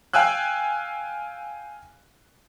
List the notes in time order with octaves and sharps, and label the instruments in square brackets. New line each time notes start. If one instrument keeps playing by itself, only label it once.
[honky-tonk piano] F5 G5 G#5 E6 F#6